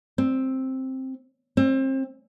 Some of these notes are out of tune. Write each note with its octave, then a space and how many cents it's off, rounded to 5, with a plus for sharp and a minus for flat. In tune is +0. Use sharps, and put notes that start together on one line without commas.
C4 +5
C4 +30